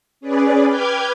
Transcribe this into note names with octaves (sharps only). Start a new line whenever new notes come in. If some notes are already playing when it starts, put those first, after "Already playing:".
C#4 G#4 B4 D5
B4 G5 D6 F6 G6 G#6